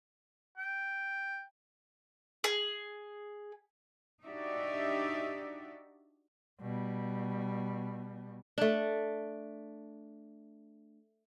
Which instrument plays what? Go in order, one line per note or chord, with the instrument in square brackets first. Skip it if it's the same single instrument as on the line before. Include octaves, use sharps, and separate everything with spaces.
[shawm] G5
[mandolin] G#4
[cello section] D4 D#4 F#4 G4 D5 E5
[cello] B2 G3
[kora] A3 D4